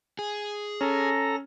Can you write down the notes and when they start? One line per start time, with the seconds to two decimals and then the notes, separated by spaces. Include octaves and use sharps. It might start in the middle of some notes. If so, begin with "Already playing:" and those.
0.19 G#4
0.81 C#4 A4 A#5 A#6